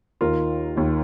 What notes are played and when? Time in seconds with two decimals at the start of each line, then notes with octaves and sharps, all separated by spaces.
0.21 D#2 D#3 F4 A#4
0.76 D#2 D#3